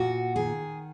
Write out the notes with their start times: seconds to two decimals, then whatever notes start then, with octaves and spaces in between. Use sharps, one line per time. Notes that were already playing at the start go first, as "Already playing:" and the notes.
Already playing: A#2 F#4
0.36 D#3 G#4